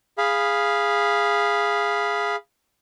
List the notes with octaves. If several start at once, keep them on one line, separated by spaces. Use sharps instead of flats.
G#4 F5 B5